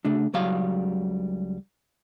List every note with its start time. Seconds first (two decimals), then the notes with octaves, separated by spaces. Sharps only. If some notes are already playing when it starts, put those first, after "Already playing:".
0.05 C#3 A3 D4
0.34 C#2 F#3 G3 F5